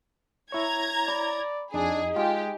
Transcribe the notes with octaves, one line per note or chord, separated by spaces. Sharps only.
E4 C#5 A#5 G#6
D5 B5
F2 D4 D#4 G#4
G#3 F4 G4 G5 G#5